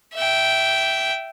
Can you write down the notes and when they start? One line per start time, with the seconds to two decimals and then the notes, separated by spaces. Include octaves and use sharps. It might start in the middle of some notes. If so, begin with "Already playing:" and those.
0.14 E5 G5